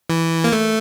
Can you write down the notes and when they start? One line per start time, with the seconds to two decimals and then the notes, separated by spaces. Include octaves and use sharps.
0.10 E3
0.44 A#3
0.52 A3